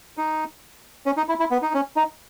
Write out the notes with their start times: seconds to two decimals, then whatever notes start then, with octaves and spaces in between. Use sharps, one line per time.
0.17 D#4
1.06 C#4
1.17 D#4
1.29 E4
1.39 E4
1.51 B3
1.62 D#4
1.74 C#4
1.96 D#4